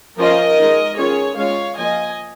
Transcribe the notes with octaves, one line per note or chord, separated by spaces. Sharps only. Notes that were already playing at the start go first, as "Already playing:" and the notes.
F3 C#4 F4 A#4 D#5
G#3 D#4
D#3 C#4 F4 G#4 C#5
G#3 C#4 F4 C#5 F5
F3 A#3 F4 D#5 G#5